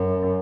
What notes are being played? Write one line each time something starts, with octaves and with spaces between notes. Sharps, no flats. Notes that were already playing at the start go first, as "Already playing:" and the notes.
Already playing: F#2